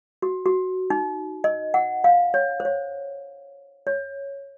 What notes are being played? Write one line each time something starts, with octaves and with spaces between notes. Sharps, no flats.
F#4
F#4
D#4
D#5
F#5
F5
C#5
C5
C#5
C#5